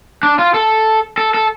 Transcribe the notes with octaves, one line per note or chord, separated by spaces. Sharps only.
D4
F4
A4
A4
A4